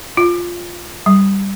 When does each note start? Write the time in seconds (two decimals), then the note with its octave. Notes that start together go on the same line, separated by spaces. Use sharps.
0.17 F4
1.06 G3